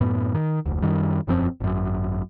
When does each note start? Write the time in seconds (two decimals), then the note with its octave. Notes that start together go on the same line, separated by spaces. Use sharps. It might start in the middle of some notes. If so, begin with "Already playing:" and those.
0.01 F#2 A2 B3
0.35 D#3
0.66 F1 D2
0.82 F#2 D#3 G3
1.27 E1 F#2 F3 C4
1.60 G#1 F#2